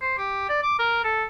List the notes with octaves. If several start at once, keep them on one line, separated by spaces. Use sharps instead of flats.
C5
G4
D5
D6
A#4
A4